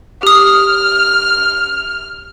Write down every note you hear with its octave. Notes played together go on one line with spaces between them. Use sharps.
G4 D#6 F6